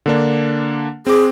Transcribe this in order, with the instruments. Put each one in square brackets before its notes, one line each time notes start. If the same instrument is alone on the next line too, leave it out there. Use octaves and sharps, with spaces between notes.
[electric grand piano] D3 A#3 D4
[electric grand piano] C4 D6 [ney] G#4